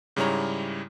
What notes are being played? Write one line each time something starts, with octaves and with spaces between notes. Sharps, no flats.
G#2 C#3 G3 E4 C#5 A#5